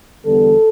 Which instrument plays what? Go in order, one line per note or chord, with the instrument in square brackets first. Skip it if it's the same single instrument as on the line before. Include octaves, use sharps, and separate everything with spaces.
[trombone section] E2 D3 G3 B3 A4